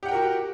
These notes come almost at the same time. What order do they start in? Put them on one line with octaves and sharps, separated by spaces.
G4 F#5 G5 A#4 F#4